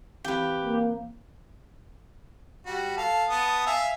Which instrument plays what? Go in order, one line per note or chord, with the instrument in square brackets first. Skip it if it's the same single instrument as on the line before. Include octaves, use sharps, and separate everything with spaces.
[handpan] E3 C4 F5 [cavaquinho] G4 B4
[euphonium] A#3
[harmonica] G3 F#4
A4 F5
B3 A5 D#6
E5 F5 G#5